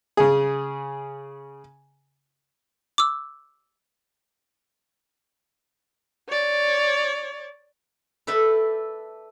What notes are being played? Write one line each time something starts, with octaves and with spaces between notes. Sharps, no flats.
C#3 G#4
D6 E6
C#5 D5
A4 B4 D5 E5 G5